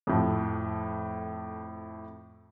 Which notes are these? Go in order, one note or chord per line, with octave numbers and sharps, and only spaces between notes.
F2 A2 F3